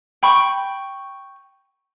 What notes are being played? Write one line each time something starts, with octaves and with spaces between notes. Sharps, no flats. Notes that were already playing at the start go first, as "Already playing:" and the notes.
G5 B5 C#6